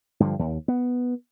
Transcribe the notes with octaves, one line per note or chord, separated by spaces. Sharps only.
G2 D3 F3
D#2
B3